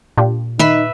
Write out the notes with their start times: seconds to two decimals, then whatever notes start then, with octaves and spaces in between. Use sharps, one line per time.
0.17 A#2 D4 F4 G4
0.59 D#3 D#4 B4 E5 C7